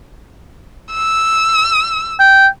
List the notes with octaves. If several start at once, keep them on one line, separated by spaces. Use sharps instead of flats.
E6
G5